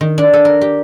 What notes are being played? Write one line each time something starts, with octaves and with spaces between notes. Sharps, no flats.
D#3
D4
A4
A#4
G4